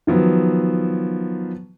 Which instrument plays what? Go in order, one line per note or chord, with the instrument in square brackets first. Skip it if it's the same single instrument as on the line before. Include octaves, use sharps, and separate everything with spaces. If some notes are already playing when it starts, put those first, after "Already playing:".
[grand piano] D#3 F3 F#3 B3